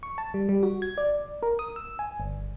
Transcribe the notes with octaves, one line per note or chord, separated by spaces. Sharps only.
C#6
A5
G3
G3
F#4
G#6
D5
A#4
D#6
E6
G#5
G1